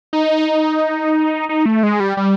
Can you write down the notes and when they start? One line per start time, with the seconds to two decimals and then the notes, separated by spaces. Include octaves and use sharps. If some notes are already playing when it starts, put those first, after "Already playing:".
0.13 D#4
1.49 D#4
1.66 A3
1.83 G#3
2.00 G3
2.17 G3